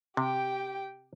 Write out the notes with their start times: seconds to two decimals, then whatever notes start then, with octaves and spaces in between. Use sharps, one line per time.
0.17 C3 G4 G5